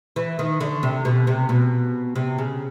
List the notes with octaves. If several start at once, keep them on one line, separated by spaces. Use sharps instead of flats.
E3
D#3
D3
C3
B2
C3
B2
C3
C#3